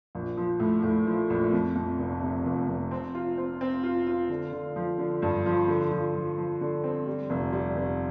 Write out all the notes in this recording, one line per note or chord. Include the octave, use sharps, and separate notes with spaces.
A#1
F3
A2
A2
F3
A#1
F2
F2
F1
C3
F1
F1
C4
F4
C4
C4
F4
F4
D3
D3
F3
D3
G2
F3
D3
F3
F3
F3
D3
C4
G3
F1
G3
F1